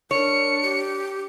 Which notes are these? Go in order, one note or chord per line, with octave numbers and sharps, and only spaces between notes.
D4 A#4 C#5 C#7
G4